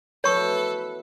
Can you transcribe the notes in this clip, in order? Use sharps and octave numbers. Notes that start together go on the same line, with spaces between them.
B2 E3 A3 A4 B4 C#5 C#6